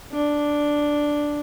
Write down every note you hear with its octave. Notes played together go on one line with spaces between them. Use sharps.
D4